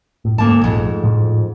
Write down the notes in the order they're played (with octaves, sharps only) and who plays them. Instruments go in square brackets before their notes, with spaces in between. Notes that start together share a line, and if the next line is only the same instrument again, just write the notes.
[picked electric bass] A2
[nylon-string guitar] D2 A#3 A5 [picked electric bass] G#2
[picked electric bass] A#1 A3 [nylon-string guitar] F2 G#2
[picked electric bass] A2 F3